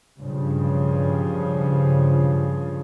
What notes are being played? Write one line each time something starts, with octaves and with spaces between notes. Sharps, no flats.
G2 C#3 F3